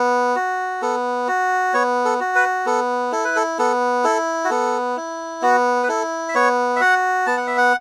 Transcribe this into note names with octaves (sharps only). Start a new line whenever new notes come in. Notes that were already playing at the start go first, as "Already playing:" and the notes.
Already playing: B3
F#4
B3 A4
F#4
B3 C#5
A4
F#4
B4
B3 A4
E4 A4
B4
A4
B3 A4
E4 A4
F#4
B3 A4
E4
B3 F#4
B4
E4 A4
E5
B3 C#5
E5
F#4 F#5
B3 A5
F#5
E5
F#5